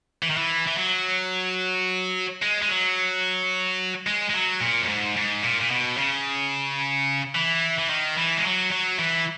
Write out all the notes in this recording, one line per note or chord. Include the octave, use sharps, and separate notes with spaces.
E3
D#3
E3
E3
F#3
G#3
G#3
F#3
G#3
G#3
F#3
A#2
F#2
G#2
G#2
A#2
A#2
B2
C#3
E3
E3
D#3
E3
G#3
F#3
F#3
E3